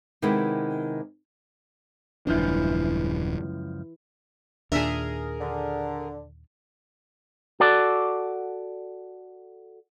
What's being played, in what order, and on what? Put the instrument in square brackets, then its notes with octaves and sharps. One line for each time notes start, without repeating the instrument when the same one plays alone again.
[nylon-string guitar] C3 D#3 G#3 B3 E4 G4
[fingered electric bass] D#1 D4 [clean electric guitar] C#2 F#2 F3 [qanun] E3
[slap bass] D#2 A#2 [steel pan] D4 E5 [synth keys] G#4 A#4
[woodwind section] D3
[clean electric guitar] F#4 A4 D5